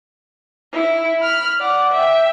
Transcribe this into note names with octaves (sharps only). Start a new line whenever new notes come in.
E4
B5 F6
D5 F#5
E5 G5